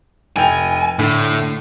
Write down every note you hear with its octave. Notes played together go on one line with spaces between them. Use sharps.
F1 G5 G#5 F7
A2 D3